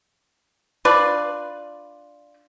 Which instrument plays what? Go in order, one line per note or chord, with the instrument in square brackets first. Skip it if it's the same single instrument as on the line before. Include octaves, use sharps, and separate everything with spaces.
[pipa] D4 F4 B4 D5